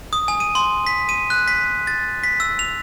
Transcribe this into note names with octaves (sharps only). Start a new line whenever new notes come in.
D#6
G#5
D#7
C6
B6
D#7
F#6
B6
A6
B6
E6
F7